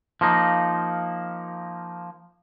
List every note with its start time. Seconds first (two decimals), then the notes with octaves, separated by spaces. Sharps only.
0.21 F3 A#3 D#4